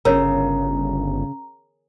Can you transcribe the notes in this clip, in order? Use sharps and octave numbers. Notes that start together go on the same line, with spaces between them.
G1 C#3 A#4 C#5 A#5